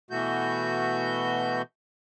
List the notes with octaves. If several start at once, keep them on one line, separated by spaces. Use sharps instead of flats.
B2 E3 A3 F#4 G6